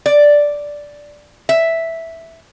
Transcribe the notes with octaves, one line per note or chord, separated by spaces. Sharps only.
D5
E5